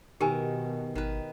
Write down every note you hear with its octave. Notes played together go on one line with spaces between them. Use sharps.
B2 D#3 G4 A#4 G#5
G#1 D#3 B4